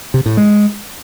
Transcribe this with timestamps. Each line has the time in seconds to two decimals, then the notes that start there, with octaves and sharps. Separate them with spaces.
0.14 C3
0.26 A2
0.37 G#3